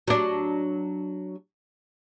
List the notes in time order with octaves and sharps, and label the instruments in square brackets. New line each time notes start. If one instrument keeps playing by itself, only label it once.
[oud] F#3 D4